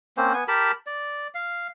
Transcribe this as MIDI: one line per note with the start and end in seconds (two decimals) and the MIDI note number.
0.17 0.33 58
0.17 0.33 60
0.17 0.33 61
0.17 0.33 72
0.34 0.44 59
0.34 0.44 80
0.48 0.72 67
0.48 0.72 70
0.48 0.72 81
0.48 0.72 83
0.87 1.28 74
1.35 1.68 77